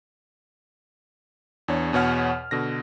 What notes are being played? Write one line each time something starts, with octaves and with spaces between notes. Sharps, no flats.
E2 D4 C#5
E2 B2 C#5 F#5 F6
B2 D3 A#6